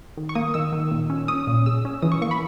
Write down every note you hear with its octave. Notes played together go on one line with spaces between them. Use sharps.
D#3
C#6
A#3 D#6
D#3 E6
D#3
A#2
C#4
C#4 D#6
A#2
C#3 E6
C#4
E3 D#6
C#6
A#3 C#6
B5